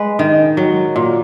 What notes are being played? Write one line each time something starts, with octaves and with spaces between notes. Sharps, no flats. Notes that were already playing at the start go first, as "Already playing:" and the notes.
Already playing: G#3 B4
D#3
F#3
A#2